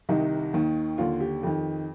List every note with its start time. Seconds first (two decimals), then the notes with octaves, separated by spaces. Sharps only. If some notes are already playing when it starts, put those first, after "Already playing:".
0.09 C2 C3 D#3 D#4
0.53 D#2 D#3
0.98 D#2 D3 F4
1.20 G4
1.43 F2 D#3